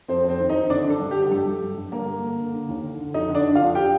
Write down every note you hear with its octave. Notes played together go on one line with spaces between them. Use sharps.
F2 C4 C5
F2
C4 C5
D#3
D#4 D#5
D#3
D3 D4 D5
D3 A4
G2
G4
D3
G4
G2 A4
G2
G2
G2
D3 A#3 A#4
D3
D3
D3
D3
D#2
D3
D3
F2 D#4 D#5
D3
D4 D5
D3
F2 F4 F5
G4 G5